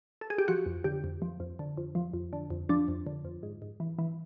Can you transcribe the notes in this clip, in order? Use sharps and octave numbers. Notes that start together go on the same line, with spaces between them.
A4
G#4
G4
F3 F#4
F2
D3 G4
F2
F3
F2
D3
F2
F3
F2
D3
F2
F3 D4
F2
D3
F2
G#2
G#2
E3
E3